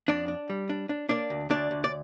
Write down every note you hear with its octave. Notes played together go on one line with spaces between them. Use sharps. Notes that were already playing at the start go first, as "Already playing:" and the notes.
F2 D4 D5
D4
G3
D4
D4
A#3 D4 D5
D2
D2 D4 D5
D2
D5